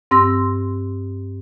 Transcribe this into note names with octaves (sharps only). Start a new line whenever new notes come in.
G2 C4 C6 E6 A#6